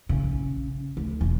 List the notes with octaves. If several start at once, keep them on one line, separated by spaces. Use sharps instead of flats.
A#1 C#3
D2
E1